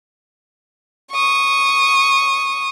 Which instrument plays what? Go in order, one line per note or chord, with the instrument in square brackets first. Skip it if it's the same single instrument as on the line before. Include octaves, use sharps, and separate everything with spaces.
[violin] C#6 D#6